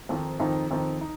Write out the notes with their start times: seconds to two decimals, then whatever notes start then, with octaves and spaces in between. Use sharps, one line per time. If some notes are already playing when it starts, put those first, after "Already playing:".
0.09 F2 D#3 C4 D#4
0.40 F2 D#3 C4 D#4
0.71 F2 D#3 C4 D#4
1.01 D#4